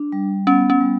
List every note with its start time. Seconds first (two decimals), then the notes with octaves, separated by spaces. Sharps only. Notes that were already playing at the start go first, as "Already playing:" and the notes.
Already playing: D4
0.12 G3
0.47 B3 C#4
0.70 C#4
0.80 G3